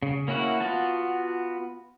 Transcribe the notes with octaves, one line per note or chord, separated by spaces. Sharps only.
C#3
A#3 C#4 E4 F#4 F#5
B3 F4 F#4 A5